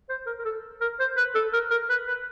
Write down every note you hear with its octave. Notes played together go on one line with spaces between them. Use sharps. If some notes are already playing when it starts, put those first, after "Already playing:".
C5
A#4
A#4
A4
A#4
C5
B4
A4
A#4
A#4
B4
B4